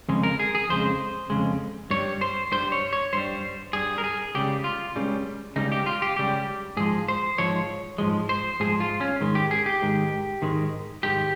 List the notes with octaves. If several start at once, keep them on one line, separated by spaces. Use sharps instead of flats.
F2 C#3 G#3
A#4
G#4
G#4
F2 C#3 G#3 C5
F2 C#3 G#3
G2 G3 C#5
C5
G2 G3 C5
C#5
C#5
G2 G3 C5
G2 G3 G#4
A#4
G#4
C#2 C#3 G3 G4
F4
C#2 C#3 G3
C#2 C#3 G3 D#4
G4
F4
G4
C#2 C#3 G3 G4
G#2 F3 G#3 G#4
C5
G#2 F3 G#3 C#5
G#2 F3 G#3
C5
G#2 F3 G#3 G#4
F4
C#4
G#2 D#3 G#3
G4
G#4
G4
G#2 D#3 G#3
G#2 D#3 G#3
G#2 D#3 G#3 G4